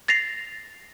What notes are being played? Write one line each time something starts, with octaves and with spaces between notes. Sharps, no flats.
A6 A#6 C7 F7